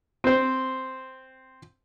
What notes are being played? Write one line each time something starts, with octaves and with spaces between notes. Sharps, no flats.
C4 C5